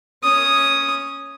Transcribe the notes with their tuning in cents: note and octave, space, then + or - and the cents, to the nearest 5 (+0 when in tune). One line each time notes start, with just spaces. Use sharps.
C#4 +0 D#6 +0